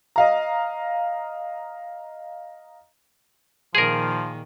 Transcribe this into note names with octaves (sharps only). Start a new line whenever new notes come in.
D#5 F5 A#5
A#2 D#3 F3 G#4 A#4